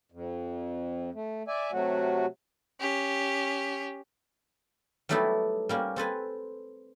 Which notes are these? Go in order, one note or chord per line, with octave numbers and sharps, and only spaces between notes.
F2
A3
D5 E5 G#5
C3 F#3 A3 F#4
C#4 G4
F#3 G3 A3 B3 D#4 E4
G3 A#3 C#4
C4 A4 B4 G#5